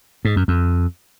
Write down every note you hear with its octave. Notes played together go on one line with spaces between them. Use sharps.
G#2
F#2
F2